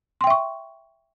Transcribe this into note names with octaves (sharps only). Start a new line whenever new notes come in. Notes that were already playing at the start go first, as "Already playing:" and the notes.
E5 G5 C6 C#6